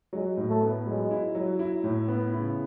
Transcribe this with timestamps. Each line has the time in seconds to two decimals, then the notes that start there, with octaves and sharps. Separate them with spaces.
0.13 F#3 G#3
0.37 A2
0.49 A3
0.62 B3
0.86 F#3 G#3
1.11 E4
1.35 F#3
1.59 E4
1.84 A2
2.08 B3
2.32 C#3 E4